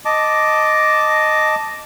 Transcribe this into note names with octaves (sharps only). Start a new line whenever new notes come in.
D#5 A5 D6